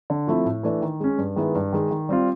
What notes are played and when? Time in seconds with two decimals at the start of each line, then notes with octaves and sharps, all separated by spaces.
0.10 D3
0.27 F3 A3 C4 E4
0.45 A2
0.63 E3 A3 D4
0.82 D#3
1.00 G#3 C#4
1.18 G2
1.36 D#3 G#3 B3 E4
1.55 G2
1.73 D#3 G#3
1.91 D#3
2.09 G3 C4 F4